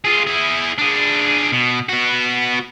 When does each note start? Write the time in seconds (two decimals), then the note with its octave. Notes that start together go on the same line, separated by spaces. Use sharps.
0.05 F4 G#4
0.27 E4 G#4
0.78 D4 G#4
1.53 B2
1.89 B3 F#4